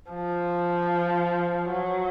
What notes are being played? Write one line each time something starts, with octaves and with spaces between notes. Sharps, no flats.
F3
F#3